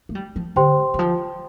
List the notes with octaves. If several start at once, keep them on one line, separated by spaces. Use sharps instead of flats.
A3
G3
F3
D3 G4 C5 G5 C6
E3
F3